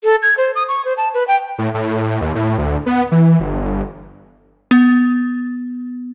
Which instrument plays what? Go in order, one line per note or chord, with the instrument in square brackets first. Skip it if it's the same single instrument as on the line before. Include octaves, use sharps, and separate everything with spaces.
[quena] A4
G#6
C5
D#6
C#6
C5
A5
B4
G5
[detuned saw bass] A2
A2
D#2
A2
D2
B3
E3
G1
[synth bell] B3